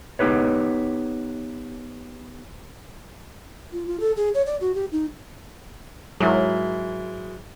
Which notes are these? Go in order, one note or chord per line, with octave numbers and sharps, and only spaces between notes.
B3 D#4 G4 B4 C#5
F4
F4
A4
G#4
C#5
D5
F#4
G4
D#4
G#2 F#3 E4 A#4